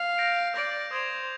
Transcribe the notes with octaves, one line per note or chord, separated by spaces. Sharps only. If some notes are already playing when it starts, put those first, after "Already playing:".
Already playing: F5
G6 A#6 D7
D5 G6 A#6 D7
C5 D#6 G#6 D7 F7